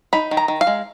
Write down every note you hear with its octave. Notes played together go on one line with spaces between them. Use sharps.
D#4 B5
D#3
A#5
D#3
F5
G#3